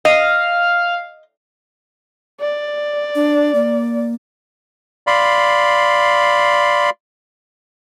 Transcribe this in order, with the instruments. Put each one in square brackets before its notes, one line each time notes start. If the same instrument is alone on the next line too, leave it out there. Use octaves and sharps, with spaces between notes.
[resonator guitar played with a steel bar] D#5 [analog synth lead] F5
[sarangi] D5
[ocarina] D4
A#3
[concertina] D5 F5 B5 C6